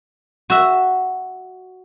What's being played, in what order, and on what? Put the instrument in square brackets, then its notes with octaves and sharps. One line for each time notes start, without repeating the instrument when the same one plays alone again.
[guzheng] F#4 E5